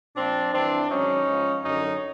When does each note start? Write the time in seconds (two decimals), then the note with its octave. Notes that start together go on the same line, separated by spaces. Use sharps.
0.17 A#2 F3 C4 D4
0.53 G2 E3 C4 D4
0.90 G#2 D#3 F#3 C#4 D#4
1.26 G#2 F3
1.63 F#2 D3 F#3 C#4 D#4